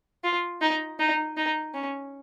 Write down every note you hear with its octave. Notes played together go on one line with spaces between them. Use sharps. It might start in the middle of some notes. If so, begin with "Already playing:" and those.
F4
D#4
D#4
D#4
C#4